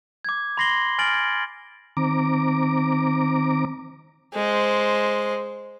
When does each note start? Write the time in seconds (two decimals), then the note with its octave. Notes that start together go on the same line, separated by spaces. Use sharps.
0.25 D6 G#6
0.57 B5 C6 A#6 C7 F#7 G7
0.98 G#5 F6 A6 D7 F#7
1.13 G#6
1.97 D#3 C4 A#5 D6
4.34 G#3 C5